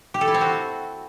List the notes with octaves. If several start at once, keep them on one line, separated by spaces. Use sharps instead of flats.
G4
A4
E4
C4
F#4